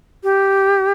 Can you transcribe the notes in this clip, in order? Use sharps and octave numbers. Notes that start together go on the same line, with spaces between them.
G4